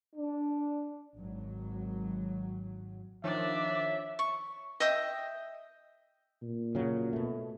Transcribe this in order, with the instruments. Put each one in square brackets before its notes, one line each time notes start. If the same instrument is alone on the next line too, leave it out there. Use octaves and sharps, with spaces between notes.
[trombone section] D4
[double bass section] G#1 F#3
[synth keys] D#3 F3 [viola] D4 D5 [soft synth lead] C#5 [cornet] E5
[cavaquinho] C#6
D#5 E5 G5 D#6
[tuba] A#2
[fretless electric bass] C#3 F#3
B2 A3